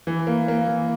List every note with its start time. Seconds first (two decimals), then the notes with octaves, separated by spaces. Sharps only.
0.07 E3
0.27 A#3
0.48 A#3
0.67 E3